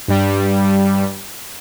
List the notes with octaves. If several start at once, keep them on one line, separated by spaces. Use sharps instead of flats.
G2 G3